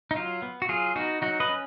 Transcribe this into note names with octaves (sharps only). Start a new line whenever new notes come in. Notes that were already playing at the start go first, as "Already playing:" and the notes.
D#4
F#3 F4
B3
F#4
F#3 F4 G#4
B3 D#4 F#4
F#3 D#4 F#4
B4 D#5
C#4